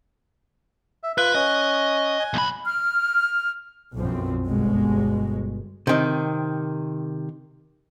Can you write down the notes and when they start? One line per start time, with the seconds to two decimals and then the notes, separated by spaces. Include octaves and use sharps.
1.03 E5
1.18 F4 B4 F#6
1.35 C#4 D#5
2.20 G#5
2.34 B1 B5
2.66 F6
3.96 B1 F#2 F3 C4
4.46 G1 B2 G#3
5.87 C3 D#3